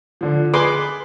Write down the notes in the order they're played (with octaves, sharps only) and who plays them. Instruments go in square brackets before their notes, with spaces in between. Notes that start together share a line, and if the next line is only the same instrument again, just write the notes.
[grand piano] D3 F3
[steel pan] G#4 C6 D6 [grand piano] B4 B5